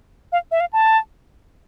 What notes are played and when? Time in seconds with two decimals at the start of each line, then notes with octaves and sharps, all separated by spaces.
0.32 F5
0.51 E5
0.60 F5
0.73 A5